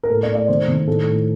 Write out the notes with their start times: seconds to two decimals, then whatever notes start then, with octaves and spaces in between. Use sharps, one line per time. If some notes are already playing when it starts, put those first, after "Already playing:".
0.03 A#4
0.10 A2 A4
0.23 D5
0.30 A3
0.35 D5
0.48 D#3 C5
0.68 D#3
0.87 A2 A4
1.07 A2